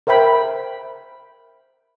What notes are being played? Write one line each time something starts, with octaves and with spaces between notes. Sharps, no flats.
A#4 C5 E5 G5 B5